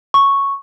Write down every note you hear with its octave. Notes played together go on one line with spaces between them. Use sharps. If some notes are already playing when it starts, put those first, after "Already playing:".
C#6